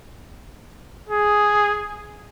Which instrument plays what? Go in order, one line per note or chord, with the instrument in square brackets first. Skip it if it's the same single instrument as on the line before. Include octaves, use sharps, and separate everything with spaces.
[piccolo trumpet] G#4